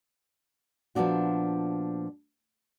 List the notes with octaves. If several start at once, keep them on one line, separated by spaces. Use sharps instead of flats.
A#2 F3 B3 C4 D4 F#4